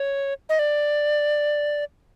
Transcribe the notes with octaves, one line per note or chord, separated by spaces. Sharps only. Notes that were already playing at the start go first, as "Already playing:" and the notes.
Already playing: C#5
D#5
D5